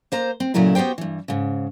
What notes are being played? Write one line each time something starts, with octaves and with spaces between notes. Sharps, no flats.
A#3 C5 A#5
C4
A#2 C#3 F#3 A3 E4 A#4
B3 F#4 G4 C5 G5
G2 E3
G#2 C#3